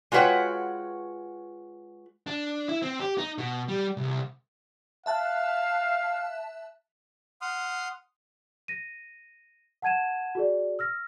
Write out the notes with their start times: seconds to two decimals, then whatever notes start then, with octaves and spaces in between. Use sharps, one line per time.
0.12 G#3 F4 F#4 B4 C#5 G5
2.27 D4
2.69 E4
2.82 C4
3.00 G4
3.18 D#4
3.38 B2
3.68 G3
3.97 C2
5.06 E5 F5 A5 F#6
7.41 F#5 C6 D#6 F6
8.68 A#6 D#7
9.82 F#5 A5 G#6 D#7 E7
10.35 F#4 G#4 D5
10.79 E6 F6 A#6